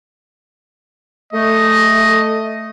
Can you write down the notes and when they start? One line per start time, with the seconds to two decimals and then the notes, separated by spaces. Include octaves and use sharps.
1.33 A3 D#5